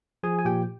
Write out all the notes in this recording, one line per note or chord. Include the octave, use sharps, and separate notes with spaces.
F3 G#4 G#5
G#5
A#2 G4 G5